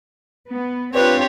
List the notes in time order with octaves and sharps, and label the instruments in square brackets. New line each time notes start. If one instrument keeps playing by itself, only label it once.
[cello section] B3
[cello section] C4 D4 F4 [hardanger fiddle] G4 C#5 [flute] B4